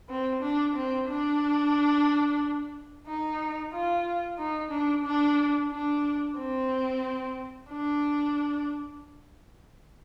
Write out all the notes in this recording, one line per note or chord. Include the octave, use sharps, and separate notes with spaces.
C4
D4
C4
D4
D#4
F4
D#4
D4
D4
D4
C4
D4